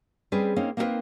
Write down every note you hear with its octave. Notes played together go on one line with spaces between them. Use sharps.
G3 C4 C#4 G#4 B4
A#3 C4 C#4 D#4
A#3 C4 D#4 E4 A#4 B4